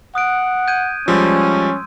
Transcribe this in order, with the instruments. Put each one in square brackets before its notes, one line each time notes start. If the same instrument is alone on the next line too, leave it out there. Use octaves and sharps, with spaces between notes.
[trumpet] F#5 [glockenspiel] D#6 F#6 D7
[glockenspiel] G6 G#6 D#7
[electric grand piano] F3 G3 G#3 [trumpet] C#4 [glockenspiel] C6 E6